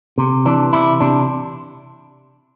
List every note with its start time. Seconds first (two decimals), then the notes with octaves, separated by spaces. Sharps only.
0.18 C3
0.45 E3 D4
0.73 C3 E4
1.00 C3 D4